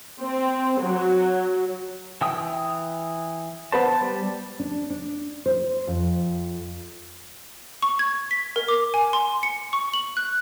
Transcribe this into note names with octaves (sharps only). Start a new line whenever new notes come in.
C4
F#3
E3 G5 D#6
B3 B4 C5 A5
G3
D4
D4
C5
F2
C#6
G#6
B6
A#4
D6
G#5
C6
C#7
C#6
F#7
F#6